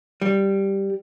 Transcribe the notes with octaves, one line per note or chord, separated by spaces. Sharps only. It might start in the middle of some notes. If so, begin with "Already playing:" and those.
G3